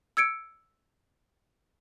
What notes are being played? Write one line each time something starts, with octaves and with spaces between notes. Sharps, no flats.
E6 G#6 C#7 D7